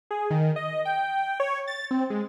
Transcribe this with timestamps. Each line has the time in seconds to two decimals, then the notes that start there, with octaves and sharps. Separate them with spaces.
0.11 G#4
0.31 D#3
0.56 D#5
0.85 G5
1.40 C#5
1.67 A6
1.91 C4
2.10 G#3